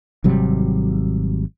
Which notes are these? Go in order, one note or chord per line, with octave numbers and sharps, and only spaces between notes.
G#1 C3 F#3 G3